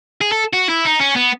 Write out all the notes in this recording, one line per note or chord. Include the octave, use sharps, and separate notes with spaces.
G#4
A4
F#4
E4
D#4
C#4
B3